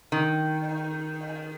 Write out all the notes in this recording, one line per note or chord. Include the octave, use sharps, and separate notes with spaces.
D#3